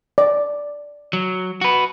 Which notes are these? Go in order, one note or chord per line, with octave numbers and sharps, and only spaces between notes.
D5
F#3
F#4 B4